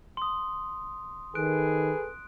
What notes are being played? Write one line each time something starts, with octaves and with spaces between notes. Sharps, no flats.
C6 D#6
D#3 G#4 A4 B4 F#6 D7